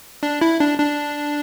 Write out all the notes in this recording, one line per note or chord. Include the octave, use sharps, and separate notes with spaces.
D4
E4
D4
D4